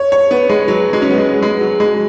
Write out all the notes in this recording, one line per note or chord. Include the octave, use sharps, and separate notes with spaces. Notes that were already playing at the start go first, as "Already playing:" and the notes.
Already playing: C#5
C#5
B3
G#3
F#3
G#3
C#4
B3
G#3
G#3
F#3
G#3